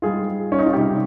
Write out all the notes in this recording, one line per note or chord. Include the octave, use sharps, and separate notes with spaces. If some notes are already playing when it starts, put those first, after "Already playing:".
G#2 G3 F4 G#4
C#4
D#4
F4
C3 G3 D#4 G4